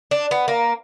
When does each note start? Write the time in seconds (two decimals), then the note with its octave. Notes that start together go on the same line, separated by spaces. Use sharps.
0.11 D4
0.31 B3
0.48 A#3